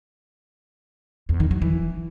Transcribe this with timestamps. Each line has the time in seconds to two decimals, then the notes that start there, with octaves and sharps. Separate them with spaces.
1.29 E2
1.40 D#3
1.51 F#3
1.62 E3